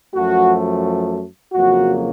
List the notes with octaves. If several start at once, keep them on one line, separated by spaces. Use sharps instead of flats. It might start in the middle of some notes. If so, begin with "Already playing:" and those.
F#2 F3 A3 F#4
F2 C#3 F#3 A#3 F#4